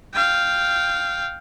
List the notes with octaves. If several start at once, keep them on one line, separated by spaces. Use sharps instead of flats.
F5 G5